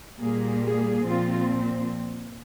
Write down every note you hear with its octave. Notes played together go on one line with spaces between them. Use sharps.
A#2 G3 A#3 G#4
G#4
A#2 F3 C4 F4